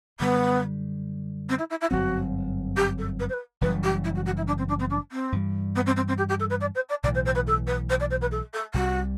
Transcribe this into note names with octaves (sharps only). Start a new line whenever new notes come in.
F#2 D3 G3 B3
C4
E4
E4
E4
G1 F#2 F#3 C4 F#4
G4
A4
B4
C5
B4
F#1 F#2 E3 G3 B4
G4
E4
F#4
F#4
E4
D4
C4
D4
C4
D4
C4
G2 E3 G3
B3
C4
C4
C4
G4
G4
A4
B4
D5
C5
D5
B1 A2 E3 D5
C5
C5
B4
A4
B4
C5
D5
C5
B4
A4
A4
C2 C3 G3 F#4